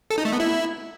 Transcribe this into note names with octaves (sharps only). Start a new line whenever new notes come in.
A4
D#4
A3
B3
E4